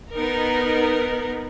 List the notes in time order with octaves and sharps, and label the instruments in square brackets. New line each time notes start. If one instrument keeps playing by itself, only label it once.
[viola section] B3 D#4 A#4